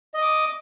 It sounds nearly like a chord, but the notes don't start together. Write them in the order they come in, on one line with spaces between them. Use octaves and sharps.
D#5 D#6 D6